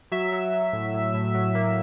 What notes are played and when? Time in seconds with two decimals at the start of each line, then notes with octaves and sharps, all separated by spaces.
0.12 F#3 E5
0.32 F#3
0.53 F#3
0.73 A2
0.94 A2
1.14 A2
1.34 F#3
1.55 A#3